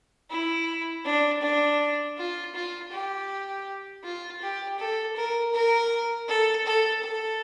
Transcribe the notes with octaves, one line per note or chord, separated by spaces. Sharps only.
E4
D4
D4
F4
F4
G4
F4
G4
A4
A#4
A#4
A4
A4
A4